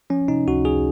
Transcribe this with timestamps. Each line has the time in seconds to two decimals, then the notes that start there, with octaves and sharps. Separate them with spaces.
0.10 F3 C#4
0.28 C3 D#4
0.47 C#2 F#4
0.65 C#2 G#4